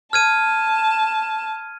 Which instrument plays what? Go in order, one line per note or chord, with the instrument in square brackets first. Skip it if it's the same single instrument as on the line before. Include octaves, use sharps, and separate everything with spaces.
[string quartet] A5 [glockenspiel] F6 G#6 D#7